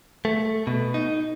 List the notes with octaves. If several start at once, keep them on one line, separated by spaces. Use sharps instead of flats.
A3
B2
D#4